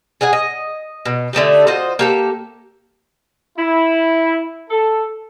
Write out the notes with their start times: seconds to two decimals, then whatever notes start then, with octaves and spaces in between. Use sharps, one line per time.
0.21 G#4 D#5 F#5 G#5
0.33 D#5
1.06 B2
1.33 D3 A3 D#4 G4
1.67 F4 F#4 C5 D#5
1.99 A#3 G4 A4
3.58 E4
4.70 A4